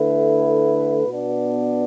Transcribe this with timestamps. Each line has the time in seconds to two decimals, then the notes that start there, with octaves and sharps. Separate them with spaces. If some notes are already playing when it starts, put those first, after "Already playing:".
Already playing: D3 A3 E4 B4
1.06 B2 B3 D4